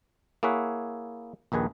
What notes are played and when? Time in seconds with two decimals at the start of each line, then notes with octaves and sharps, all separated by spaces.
0.43 A#3 E4 G#4 C#5 E5 F#5
1.52 A#1 D#2 D#3 G#4 B4